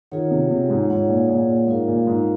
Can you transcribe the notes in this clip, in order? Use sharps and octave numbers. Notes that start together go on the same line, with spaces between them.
D#3 F4 G#4 C#5 F#5
C3
C3
G#2
G#2 F4 G#4 C#5 F#5
A#2
A#2
A#2
G#2 F4 A#4 F5
A#2
G#2